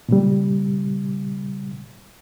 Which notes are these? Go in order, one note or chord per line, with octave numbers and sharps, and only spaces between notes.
A#2 C#3 G3